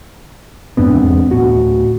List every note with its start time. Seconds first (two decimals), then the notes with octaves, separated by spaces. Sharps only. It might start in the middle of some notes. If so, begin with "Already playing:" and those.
0.77 F2 G#2 C3 B3 C4 D4
0.95 E2 G#3
1.31 D1 A2 C#4 F#4